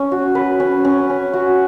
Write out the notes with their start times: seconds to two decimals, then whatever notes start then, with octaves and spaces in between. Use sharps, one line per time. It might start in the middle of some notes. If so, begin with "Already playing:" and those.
Already playing: C#4
0.12 F#4
0.35 B4
0.60 C#4
0.84 C#4
1.10 C#4
1.33 F#4